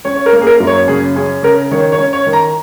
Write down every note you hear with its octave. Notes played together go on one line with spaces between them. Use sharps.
C#4 C#5
C#5
A#4
A#3
G#4
A#4
F#2
C#5
C#3 G#4
C#4 G#4
C#3 A#4
D#3 C#5
C#5
C#4
C#5
D#3
A#5